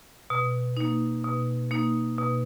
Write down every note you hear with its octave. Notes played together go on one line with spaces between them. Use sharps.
B2
A#3 D#4
B2
A#3 D#4
B2